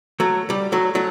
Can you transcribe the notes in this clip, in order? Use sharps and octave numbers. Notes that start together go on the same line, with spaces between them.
F#3 A3
G3
F#3 A3
F#3 A3